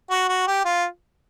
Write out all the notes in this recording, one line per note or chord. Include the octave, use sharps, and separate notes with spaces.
F#4
F#4
G4
F4